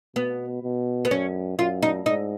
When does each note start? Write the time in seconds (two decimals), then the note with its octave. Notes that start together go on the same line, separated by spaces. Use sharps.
0.16 B2 B3
0.63 B2
1.05 B3
1.11 F#2 C#4
1.58 F#2 F4
1.82 D#4
2.06 G#2 D#4